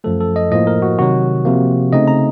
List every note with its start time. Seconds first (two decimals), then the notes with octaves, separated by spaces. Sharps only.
0.04 F#2 F3 A3 A4
0.21 A4
0.36 D#5
0.51 A2 F3 A#3 D#5
0.67 A#4
0.82 F#4
0.98 C3 D#3 F#3 F#4
1.45 C3 F3 A#3
1.93 C#3 A3 C4 D#4 D#5
2.08 A#5